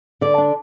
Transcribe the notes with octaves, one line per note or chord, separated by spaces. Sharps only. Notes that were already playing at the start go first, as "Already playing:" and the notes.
D3 D5
D4